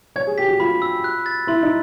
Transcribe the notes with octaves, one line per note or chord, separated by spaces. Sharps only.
C#5 G#6
G#4
G4 B6
F#4
F4 B5
E6
F#6
A6
E4 C6
D#4